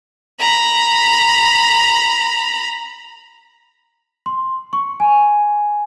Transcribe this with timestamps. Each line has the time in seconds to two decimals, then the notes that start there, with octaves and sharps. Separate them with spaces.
0.40 A#5 B5
4.26 C6
4.73 C#6
5.00 G#5